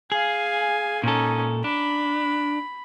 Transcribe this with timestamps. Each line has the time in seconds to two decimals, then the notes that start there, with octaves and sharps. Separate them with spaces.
0.12 G#4 F5 G#5
1.04 A#2 C#4 D#4 A4
1.64 D4 B5